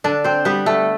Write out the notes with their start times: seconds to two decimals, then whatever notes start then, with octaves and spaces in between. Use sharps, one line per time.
0.04 D3 D4 D5
0.24 C4 C5
0.45 G3 B3 B4
0.66 A3 A4